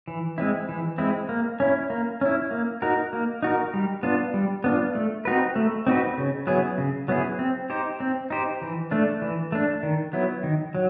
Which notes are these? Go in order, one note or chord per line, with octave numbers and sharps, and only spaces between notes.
E3
G#3 C4 E4
E3
G#3 C4 E4
A#3
C#4 E4
A#3
C#4 E4
A#3
D#4 F#4 A#4
A#3
D#4 F#4 A#4
G3
B3 D4 F4
G3
B3 D4 F4
A3
C4 D#4 F#4 B4
A3
C4 D#4 F#4 B4
C#3
F#3 B3 E4 G#4
C#3
F#3 B3 E4 G#4
C4
D#4 G4 C5
C4
D#4 G4 C5
E3
A3 D4
E3
A3 D4
D#3
F#3 B3 E4
D#3
F#3